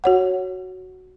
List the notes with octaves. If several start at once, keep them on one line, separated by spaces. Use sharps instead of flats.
F#4 C#5 F#5